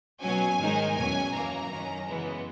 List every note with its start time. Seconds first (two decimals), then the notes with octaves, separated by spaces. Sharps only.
0.21 B2 F#3 C#4 G#5
0.58 G#2 D#3 G#3 D#4
0.95 E2 B2 F#3 C#4 G#5
1.33 F#2 E3 A#3 A#5
1.70 F#2 D#3 F#3 C#4
2.07 F#2 C#3 E3 G#3 B3